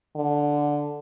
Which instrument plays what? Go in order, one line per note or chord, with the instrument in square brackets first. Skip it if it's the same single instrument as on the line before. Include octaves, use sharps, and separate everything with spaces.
[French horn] D3